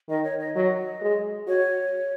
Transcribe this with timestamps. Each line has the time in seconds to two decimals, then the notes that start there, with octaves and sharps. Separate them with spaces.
0.09 D#3 D#5
0.24 C#5
0.40 D#5
0.55 F#3 D#5
1.01 G#3
1.48 F#4 C#5